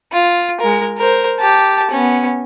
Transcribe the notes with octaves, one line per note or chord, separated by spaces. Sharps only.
F4
G#3 A#4
A#4 C5
G4 A5
B3 C#4